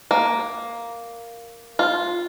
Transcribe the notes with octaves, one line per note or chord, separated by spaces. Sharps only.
A#3
F4